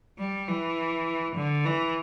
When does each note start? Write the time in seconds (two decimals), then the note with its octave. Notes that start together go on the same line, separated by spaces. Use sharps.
0.18 G3
0.48 E3
1.35 D3
1.65 E3